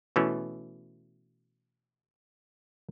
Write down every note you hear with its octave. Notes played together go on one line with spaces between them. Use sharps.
B2 E3 A3 C#4